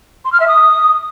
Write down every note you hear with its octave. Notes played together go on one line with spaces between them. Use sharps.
C6
F6
E5
D#6